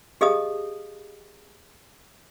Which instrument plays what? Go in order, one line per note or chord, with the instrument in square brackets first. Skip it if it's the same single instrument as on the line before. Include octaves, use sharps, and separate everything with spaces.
[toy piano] G4 G#4 D#5 F5 A5 D#6